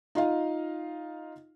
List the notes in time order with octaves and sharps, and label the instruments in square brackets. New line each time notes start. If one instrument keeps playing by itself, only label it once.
[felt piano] D#4 F4 D#5 F5